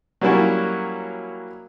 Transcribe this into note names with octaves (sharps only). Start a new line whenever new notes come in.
F#3 G3 A#3 C#4 E4 F#4